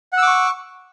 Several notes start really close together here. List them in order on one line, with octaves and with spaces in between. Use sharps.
F#5 E6 D6 C#6